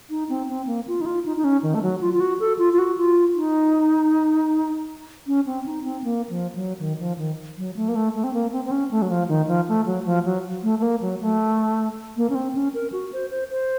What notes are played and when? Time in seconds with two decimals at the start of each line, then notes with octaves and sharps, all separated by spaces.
0.10 D#4
0.30 C4
0.49 C4
0.67 A#3
0.88 F4
1.01 D#4
1.06 F4
1.26 D#4
1.37 D#4
1.44 C#4
1.63 D#3
1.74 A3
1.82 F#3
2.01 F4
2.14 F4
2.20 F#4
2.40 A4
2.59 F4
2.73 F4
2.79 F#4
2.98 F4
3.36 D#4
5.27 C#4
5.46 C4
5.66 D#4
5.84 C4
6.04 A#3
6.29 F3
6.55 F#3
6.80 D#3
7.00 F3
7.18 D#3
7.57 F#3
7.76 A3
7.89 A#3
7.95 A3
8.15 A3
8.24 C4
8.34 A#3
8.53 C4
8.65 C4
8.71 C#4
8.91 A3
9.02 F#3
9.10 F3
9.29 D#3
9.48 F3
9.68 A3
9.86 F#3
10.06 F3
10.25 F#3
10.63 A3
10.79 A3
10.82 A#3
11.02 F#3
11.21 A3
12.17 A#3
12.30 C#4
12.35 C4
12.55 C#4
12.74 A#4
12.92 F#4
13.13 C5
13.31 C5
13.50 C5